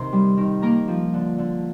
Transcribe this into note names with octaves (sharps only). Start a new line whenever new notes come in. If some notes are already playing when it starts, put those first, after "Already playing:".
Already playing: C3 D#3 A#4 C5 C6
G3
D#3
A#3 A#4 A#5
F3
D3
D3